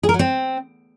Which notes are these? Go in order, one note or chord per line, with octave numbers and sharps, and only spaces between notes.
G#4
A#4
F#3
C4